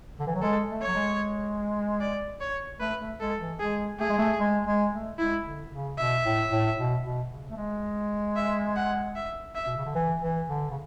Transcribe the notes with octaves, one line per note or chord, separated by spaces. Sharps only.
D3
E3
F#3
G#3 A4
A3
C#5
F#3
G#3
D5
C#5
A3 B4
A3
G#3 A4
E3
G#3 G#4
A3 G#4
G#3
A3
G#3
G#3
A3
G#3 E4
D3
C#3
B2 E5
A2
A2
B2
B2
C#3
A3
G#3
E5
F#5
E5
E5
B2
C#3
D3
E3
E3
D3
C#3